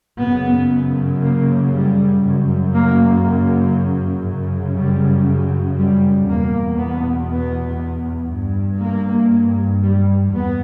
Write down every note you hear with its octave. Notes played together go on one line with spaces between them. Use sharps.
F#2 C#3 B3
A#3
G3
F#2 C#3
A#3
A#3
F#2 C#3
G3
G3
E2 B2 A#3
B3
B3
G2
A#3
G3
E2 B3